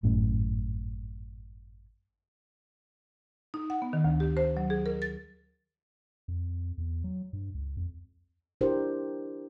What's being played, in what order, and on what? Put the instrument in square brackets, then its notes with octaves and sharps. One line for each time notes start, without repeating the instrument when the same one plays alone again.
[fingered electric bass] G#1 F#2 A2 C#4
[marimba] D#4
F#5
B3
D#3
D2
G4
C5
F#3
G#4
A#4
A6
[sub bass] F2
E2
F#3
G2
C#2
F2
[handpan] D4 E4 G4 A#4 C5